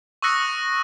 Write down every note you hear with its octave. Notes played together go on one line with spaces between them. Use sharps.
C#6 D#6 E6 F#6 A#6 C#7